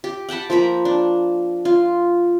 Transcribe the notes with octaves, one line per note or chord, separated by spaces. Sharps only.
G4
F#5 G5 A5 B5
F3 A#3 A#5 B5
D4
F4